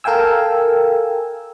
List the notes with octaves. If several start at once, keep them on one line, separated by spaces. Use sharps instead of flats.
A4 A#4 F5 G5 G#5 E6